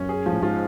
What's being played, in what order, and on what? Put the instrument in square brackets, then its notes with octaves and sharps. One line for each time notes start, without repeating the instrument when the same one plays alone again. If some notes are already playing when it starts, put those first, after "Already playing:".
Already playing: [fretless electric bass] F#2 [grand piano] C#4
[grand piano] G#4
F3
[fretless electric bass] A2
[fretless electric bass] G#2 [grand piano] F4